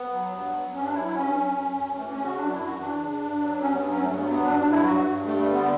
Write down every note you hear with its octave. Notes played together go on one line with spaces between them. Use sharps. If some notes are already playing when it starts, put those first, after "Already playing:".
Already playing: B3
F#3
G2
F#3
G2 C#4
D4
F#3 E4
E4
G2 C#4
F#3
F#2
F#2
E3 A3
C#4
C#3
F#4
F#2 D4
E4
F#2
F#4
E3 D4
C#3
G2
F#3
G2 C#4
B3
F#3 B3
C#4
G2 A3
B3
F#3
B3
G2 D4
D4
F#3
E4
G2 F#4
G2
G3 A3
A3
D3
B3